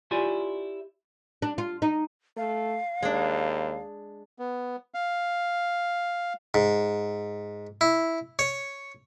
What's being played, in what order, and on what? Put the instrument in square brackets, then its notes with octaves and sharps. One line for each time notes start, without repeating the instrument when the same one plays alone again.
[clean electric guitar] E4 F4 G4 C#5 D5 G#5
[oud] D4
F4
D#4
[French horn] A3 [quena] F5
[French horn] D#2 [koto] G#3 D4
[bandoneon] B3
F5
[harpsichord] G#2
E4
C#5